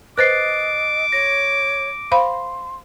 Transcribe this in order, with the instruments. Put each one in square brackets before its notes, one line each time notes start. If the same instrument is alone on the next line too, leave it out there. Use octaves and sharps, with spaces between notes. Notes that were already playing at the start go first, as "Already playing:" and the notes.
[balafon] B4 C5 [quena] D#5 [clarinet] D6 [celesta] F#6 A6 C7
[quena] C#5 [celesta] A#6
[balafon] C5 F5 B5 [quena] C6